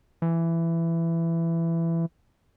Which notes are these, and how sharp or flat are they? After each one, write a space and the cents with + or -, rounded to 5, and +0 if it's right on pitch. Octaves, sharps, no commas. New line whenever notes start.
E3 +15